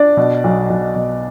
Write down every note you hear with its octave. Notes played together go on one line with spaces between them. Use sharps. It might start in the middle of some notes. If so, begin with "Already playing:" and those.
Already playing: D4 D5
B2
B1
B1
B2